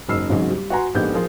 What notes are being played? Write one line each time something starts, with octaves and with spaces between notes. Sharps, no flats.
F#1 G#2 B5 E6 F6 C7
G#1 G#2 C#3 F#3
G3
F#4 B4 F#5 G#5 A#5 C6
A#1 G#2 B3 G4 A4 G6
F3 F4 G#4 A#4